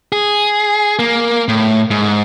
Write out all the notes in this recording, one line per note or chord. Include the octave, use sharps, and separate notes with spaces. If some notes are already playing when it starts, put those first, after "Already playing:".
G#4
A#3
A2
G#2